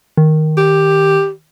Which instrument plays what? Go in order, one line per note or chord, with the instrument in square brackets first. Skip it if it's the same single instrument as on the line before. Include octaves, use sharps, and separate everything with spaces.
[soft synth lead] D#3
[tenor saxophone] G4